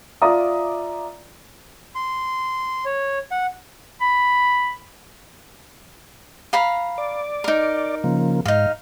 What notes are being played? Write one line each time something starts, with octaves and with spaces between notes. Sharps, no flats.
F4 D5 E5 A#5 D6 D#6
C6
C#5
F#5
B5
F5 A#5 B5
D5
D#4 A#4
C#3 F3 A#3
G#2 D#4 F5